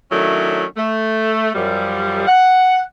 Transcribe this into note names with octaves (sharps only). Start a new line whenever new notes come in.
D#3 F#3 A3 C#4 D4 E4
A3
F#2 F3 G3
F#5